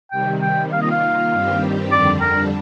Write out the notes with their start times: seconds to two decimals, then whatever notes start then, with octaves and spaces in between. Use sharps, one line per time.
0.11 C3 D#3 G3 G5
0.42 G5
0.72 D#3 A#3 F4 F5
0.82 D#5
0.91 F5
1.32 G2 D#3 G3 C4 G4
1.92 F2 D3 G3 D4 D5
2.21 A#4